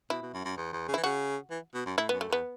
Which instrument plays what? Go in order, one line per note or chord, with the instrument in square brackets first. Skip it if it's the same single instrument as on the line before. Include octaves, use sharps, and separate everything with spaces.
[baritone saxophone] B2 [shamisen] E4
[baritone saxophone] B2
F#2
F#2
E2
E2
C#3
[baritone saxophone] E3 [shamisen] E4
[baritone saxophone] C#3 [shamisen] F#4
[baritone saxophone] E3
B2
F#2
[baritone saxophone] A2 [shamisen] E4
[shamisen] B3
[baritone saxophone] F#2
[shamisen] A3
[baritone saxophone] E2 [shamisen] B3